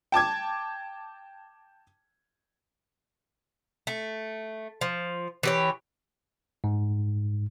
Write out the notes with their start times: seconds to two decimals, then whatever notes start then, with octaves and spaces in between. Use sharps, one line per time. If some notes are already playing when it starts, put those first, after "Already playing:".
0.12 G5 A5 D6 G#6
3.87 A3
4.81 F3
5.43 E3 G4 C#5
6.64 G#2